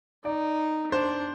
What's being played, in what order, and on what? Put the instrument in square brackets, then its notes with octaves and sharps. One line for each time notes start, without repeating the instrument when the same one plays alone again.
[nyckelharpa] D#4 [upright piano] D5
[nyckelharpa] D4 [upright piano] C5